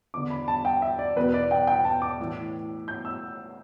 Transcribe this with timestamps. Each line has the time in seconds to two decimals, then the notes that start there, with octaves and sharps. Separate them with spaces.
0.14 E2 D3 D6
0.30 B5
0.48 A5
0.65 G5
0.82 E5
0.99 D5
1.16 E2 B2 B4
1.34 D5
1.51 G5
1.67 G5
1.85 A5
2.02 D6
2.20 A2 E3
2.88 G6
3.05 E6